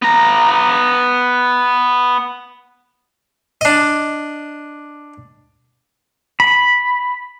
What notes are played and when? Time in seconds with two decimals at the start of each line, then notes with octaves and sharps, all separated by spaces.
0.02 B3 A#5
3.61 D4 D#5
6.40 B5